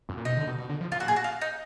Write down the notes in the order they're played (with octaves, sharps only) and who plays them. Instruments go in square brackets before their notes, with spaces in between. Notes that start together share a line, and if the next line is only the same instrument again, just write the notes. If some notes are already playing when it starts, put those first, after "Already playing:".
[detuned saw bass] F#2
A#2
[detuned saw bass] B2 [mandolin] D#4
[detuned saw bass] D3
B2
B2
D3
F3
[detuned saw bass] A#2 [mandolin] F4
[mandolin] F#4
G#4
F#4
F4
D#4